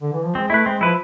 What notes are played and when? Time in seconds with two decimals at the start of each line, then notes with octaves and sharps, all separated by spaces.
0.02 D3
0.13 E3
0.25 F3
0.35 G#3 C4
0.50 A3 E4 B4
0.65 G#3 C4
0.81 F3 E4 B4